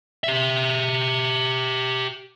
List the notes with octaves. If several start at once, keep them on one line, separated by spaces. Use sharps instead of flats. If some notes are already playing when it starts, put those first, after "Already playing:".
G4 E5